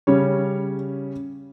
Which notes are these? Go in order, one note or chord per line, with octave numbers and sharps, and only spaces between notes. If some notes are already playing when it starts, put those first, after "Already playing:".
C#3 G3 C#4 C#5